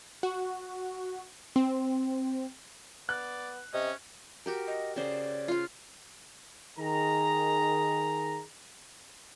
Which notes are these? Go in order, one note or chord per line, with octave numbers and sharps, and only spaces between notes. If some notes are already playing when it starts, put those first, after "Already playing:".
F#4
C4
B3 D5 F#6
C3 C#4 D#5
F#4 G4 A#4
D#5
C#3 C5 D5
F4 F5
D#3 G#4 A#5